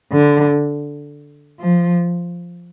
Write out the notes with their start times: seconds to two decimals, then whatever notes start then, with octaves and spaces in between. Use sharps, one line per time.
0.12 D3
1.59 F3